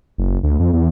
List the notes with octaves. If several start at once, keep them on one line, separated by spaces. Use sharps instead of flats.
F#1
D2
F2
E2